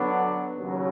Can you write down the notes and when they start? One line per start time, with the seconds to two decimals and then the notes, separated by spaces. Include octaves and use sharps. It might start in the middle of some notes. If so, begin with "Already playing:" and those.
Already playing: D3 F#3 B3 D4
0.57 D#2 C#3 F#3